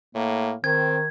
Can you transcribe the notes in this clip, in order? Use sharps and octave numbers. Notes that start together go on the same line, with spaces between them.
A2 A#3
D#3 C4 G#6